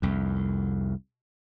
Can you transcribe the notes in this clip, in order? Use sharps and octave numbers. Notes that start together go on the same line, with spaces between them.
C2 F2